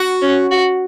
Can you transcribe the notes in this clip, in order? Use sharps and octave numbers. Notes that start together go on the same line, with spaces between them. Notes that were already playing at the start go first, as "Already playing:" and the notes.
Already playing: F#4
C#4
F#4